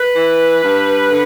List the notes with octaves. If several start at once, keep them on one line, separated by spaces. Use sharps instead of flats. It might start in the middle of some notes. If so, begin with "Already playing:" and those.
Already playing: B4
E3
G2
D3